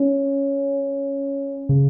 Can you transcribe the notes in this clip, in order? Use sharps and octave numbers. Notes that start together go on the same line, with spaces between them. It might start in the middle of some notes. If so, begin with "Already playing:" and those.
Already playing: C#4
C#3